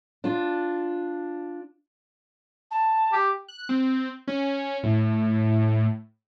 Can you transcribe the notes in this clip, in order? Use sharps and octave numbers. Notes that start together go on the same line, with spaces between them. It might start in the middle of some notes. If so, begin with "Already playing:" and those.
D4 F4
A5
G4
F#6
C4
C#4
A2